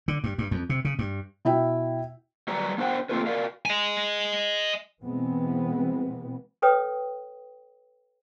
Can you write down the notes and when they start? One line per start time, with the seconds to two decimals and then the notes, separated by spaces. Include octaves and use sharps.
0.08 D3
0.24 G2
0.38 G2
0.51 F2
0.70 C3
0.85 C#3
0.99 G2
1.45 B2 E4 E5 G5
2.48 F#3 G3 F#4 B4 D5 A#5
2.78 B3 D4 C5 F#5 G5
3.09 A3 A#3 C4 F4 A4 B4
3.27 F#4 A#4 D5 F5
3.66 D#5 G#5
5.02 B2 E3 G#3 B3 C4
6.62 A4 B4 C#5 G5 D#6